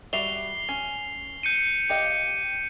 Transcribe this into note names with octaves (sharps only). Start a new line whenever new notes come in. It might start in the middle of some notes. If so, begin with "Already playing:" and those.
G3 F#4 E5 C7 F7 G7
C#4
G6 C#7 D#7
G4 D#5 F5